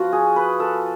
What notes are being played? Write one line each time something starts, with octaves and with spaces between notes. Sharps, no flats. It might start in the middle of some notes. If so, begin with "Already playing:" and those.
Already playing: F3 B3 F4 F#4
G#4
B4
A4